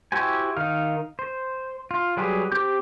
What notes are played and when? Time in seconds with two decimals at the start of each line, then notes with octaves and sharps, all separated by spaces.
0.12 E4 F#4 G4 C5 G#5
0.57 D#3 D#4 F5
1.19 C5
1.91 F4
2.17 F#3 G3 G4 G#4 B4
2.52 C4 G4 D6 G6